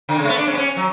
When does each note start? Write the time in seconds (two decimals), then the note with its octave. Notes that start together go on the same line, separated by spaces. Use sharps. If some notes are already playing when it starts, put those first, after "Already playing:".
0.09 D3
0.18 C#3
0.24 A3
0.28 B3
0.38 D4
0.47 C#4
0.53 B3
0.58 C#4
0.77 F#3